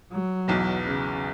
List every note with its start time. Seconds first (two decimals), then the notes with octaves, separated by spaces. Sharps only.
0.12 F#3
0.48 B1 E2 B2
0.87 C#3